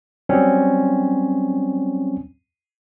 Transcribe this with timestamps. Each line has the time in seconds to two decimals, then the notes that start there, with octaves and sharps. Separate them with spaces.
0.29 F#3 G3 C4 C#4